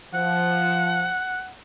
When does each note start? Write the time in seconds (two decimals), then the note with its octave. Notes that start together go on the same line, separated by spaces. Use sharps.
0.14 F3 F#5